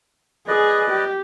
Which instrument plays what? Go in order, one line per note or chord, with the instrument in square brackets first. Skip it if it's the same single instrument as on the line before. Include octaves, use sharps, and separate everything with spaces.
[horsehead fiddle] G#4 [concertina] B4 D5 D#5
[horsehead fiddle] G4